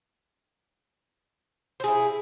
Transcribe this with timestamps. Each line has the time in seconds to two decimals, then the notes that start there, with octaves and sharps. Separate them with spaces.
1.80 C5
1.84 G#4
1.88 E4